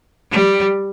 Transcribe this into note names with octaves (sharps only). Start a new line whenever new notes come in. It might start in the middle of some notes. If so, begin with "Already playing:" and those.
G3